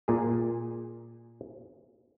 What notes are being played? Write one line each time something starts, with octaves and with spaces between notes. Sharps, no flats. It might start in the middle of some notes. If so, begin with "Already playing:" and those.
A#2 G#4